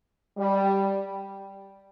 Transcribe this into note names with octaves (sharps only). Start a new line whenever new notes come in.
G3